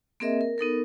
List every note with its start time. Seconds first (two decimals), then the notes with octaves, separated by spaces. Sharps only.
0.20 A#3 C4 G#4 A#4 D#5 E5
0.41 A#4
0.58 B3 D#4 A4 A#4